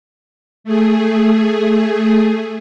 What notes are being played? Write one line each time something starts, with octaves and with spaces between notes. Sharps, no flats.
A3 G#4